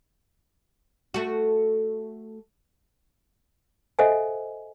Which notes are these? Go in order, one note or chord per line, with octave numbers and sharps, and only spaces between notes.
A3 F#4
A4 C5 D#5 E5 F#5 G#5